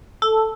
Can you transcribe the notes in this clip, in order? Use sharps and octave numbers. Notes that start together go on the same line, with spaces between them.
A4